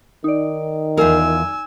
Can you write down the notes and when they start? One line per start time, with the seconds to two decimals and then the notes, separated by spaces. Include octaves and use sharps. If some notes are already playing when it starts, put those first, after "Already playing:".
0.24 D#3 D#4 D5
0.97 E2 F4 A#4 G#5 E6